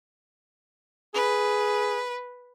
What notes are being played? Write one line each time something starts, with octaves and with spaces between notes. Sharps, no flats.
G#4 B4